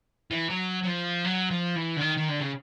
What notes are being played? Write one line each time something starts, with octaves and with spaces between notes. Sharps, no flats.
E3
F#3
F#3
F3
F#3
F3
E3
D3
D#3
D#3
D3
C#3